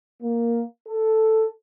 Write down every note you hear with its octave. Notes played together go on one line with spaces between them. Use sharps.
A#3
A4